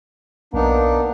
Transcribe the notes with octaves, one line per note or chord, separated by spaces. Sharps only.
B1 A#3 B3 D4 D#4